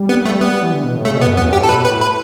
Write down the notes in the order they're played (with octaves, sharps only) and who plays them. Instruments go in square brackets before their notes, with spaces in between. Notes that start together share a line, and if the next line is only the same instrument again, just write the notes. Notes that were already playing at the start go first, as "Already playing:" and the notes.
Already playing: [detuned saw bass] G3
[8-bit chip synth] B3
A3
[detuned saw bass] G3 [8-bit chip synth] B3
[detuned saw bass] G3
E3
D3
B2
A2
[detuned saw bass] C#3 [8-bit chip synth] A3
[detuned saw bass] B2
[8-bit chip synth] B3
[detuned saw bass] F#2
[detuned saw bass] E2 [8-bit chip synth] B3
[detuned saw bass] F#2 [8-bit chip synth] G4
[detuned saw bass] A2
[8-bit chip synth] A4
[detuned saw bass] B2 [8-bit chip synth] B4
[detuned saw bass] A2 [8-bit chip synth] B4
[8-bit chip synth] B4